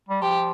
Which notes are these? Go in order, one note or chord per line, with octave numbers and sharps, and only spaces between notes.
G3
F3 G4